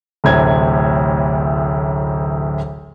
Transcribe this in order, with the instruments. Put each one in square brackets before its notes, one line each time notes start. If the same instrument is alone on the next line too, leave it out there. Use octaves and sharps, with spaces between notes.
[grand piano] D1 A1 D2 C3 G#6